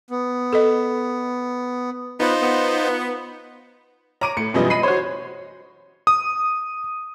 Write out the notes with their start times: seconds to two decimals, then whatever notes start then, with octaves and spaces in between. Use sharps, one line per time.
0.11 B3
0.53 A4 D#5
2.20 B3 D#4 F4 C5
2.41 B3
4.21 C#5 A#5 D6 D7 D#7
4.37 A2 C#7
4.54 F#2 B2 E3 G3 F4 D#5
4.70 D#5 B5 C7 D#7
4.83 F#4 C5 C#5
6.07 D#6